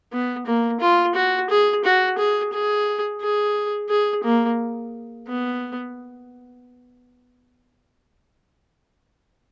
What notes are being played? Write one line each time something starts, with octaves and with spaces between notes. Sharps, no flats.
B3
A#3
F4
F#4
G#4
F#4
G#4
G#4
G#4
G#4
A#3
B3